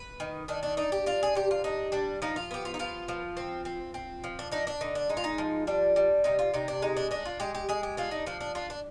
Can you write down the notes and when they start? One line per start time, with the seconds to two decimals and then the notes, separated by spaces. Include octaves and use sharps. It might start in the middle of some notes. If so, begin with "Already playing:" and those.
Already playing: B4
0.20 D#3
0.48 D#3 D4
0.63 D4
0.77 D4 D#4
0.92 G4
1.06 D4 F4
1.23 G#4
1.35 C3 G4
1.51 F4
1.64 D4 D#4
1.92 G3 D4
2.22 F3 D#4
2.36 F4
2.51 B3 G4
2.65 F4
2.74 D#4
2.79 F3 F4
3.08 F3
3.37 C4
3.65 C4
3.94 C4
4.24 F3
4.39 D4
4.52 D4 D#4
4.67 D4
4.81 D3 D#4
4.95 D4
5.09 G#3 D#4
5.17 F4
5.24 D#4
5.38 F3
5.67 G3 D4
5.96 G3
6.24 C3 D#4
6.39 F4
6.54 C3 D#4
6.68 D4
6.82 G#3 D#4
6.97 D4
7.11 D4 D#4
7.25 F4
7.40 G#3 G4
7.55 G4
7.69 G#3 G#4
7.83 G4
7.97 D4 F4
8.11 D#4
8.26 F3 D4
8.40 D4
8.55 D4 F4
8.70 D4